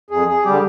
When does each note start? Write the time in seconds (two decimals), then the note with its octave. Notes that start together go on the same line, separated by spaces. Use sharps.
0.11 F2 G#4
0.28 G#4
0.45 D3 G3 G4